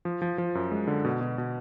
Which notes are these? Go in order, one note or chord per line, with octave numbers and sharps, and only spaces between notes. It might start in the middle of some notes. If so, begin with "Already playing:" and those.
F3
F3
F3
F#2
G#3
D3
B2
B2
B2